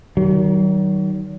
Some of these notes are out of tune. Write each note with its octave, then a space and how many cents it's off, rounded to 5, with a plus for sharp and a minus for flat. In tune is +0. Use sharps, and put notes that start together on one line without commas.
D#3 +0 F#3 +40